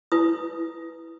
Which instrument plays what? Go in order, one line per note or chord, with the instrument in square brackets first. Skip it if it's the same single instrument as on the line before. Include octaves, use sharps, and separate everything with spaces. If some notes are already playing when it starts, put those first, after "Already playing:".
[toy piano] E4 B4 D#6